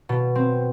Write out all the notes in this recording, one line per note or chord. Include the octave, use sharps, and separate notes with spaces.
B2
C4